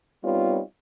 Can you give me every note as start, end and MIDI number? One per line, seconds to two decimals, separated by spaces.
0.23 0.60 55
0.23 0.60 59
0.23 0.60 60
0.23 0.60 63
0.23 0.60 65
0.23 0.60 73